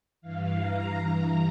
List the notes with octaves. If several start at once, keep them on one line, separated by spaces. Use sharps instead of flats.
G2 E3 F5
A#5
G2 E3 A#5